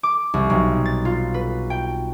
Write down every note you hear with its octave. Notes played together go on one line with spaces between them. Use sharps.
D6
C2
B1
A6
F4
B4
G5